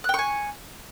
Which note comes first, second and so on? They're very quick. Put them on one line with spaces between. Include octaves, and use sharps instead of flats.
F#6 G5 C#6 G#5